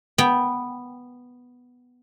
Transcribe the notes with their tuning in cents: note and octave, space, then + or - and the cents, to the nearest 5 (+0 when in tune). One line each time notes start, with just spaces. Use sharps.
B3 +0 G5 +0